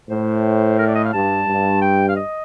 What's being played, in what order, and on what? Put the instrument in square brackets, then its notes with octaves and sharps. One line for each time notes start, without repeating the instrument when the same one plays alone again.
[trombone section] A2 [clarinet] C5
[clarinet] A#4
D5
D#5
F5
[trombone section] G2 [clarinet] A5
[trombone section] G2
[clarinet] G5
F5
D#5